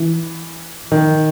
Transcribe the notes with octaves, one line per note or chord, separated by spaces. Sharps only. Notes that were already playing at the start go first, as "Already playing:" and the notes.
Already playing: E3
D#3